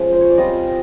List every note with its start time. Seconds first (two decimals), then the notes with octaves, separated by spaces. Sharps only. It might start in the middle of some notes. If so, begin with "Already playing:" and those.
Already playing: F3 G#3 C#4
0.12 C5
0.21 C#5
0.30 D5
0.38 G3 C4 F4 D#5